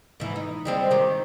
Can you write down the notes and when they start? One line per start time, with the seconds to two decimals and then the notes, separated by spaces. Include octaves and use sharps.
0.20 G#2 E3
0.36 D#4
0.65 G3 G#3 C4
0.91 D#3 G4